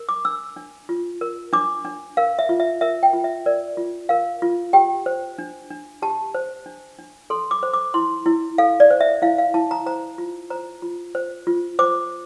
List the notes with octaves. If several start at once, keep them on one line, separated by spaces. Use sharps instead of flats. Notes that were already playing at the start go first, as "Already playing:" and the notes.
Already playing: A#4
D6
D4 E6
D4
F4
A#4
D4 D6
D4
A#4 F5
E5
F4
E5
A#4 E5
G5
F4
E5
A#4 D5
F4
A#4 F5
F4
G4 G5
C5
D4
D4
G4 A5
C5
D4
D4
A4 C6
D6
C5
D6
E4 C6
E4
A4 F5
D5
C5
E5
E4 F5
F5
E4 A5
A#5
C5 A#5
F4
C5 A#5
F4
C5
F4
C5 D6